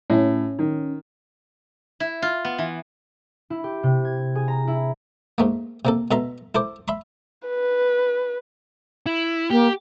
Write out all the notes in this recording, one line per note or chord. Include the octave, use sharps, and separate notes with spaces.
A2 C#4
D#3
E4
F4
B3
E3
E4
G4
C3
G#6
G#4
A#5
E4
G#2 A3 A#3
C3 A#3 A4
B2 A4 E5 A#5 C6
E4 A4 C5 D6
E5 B5 C6
B4
E4
A#3 G4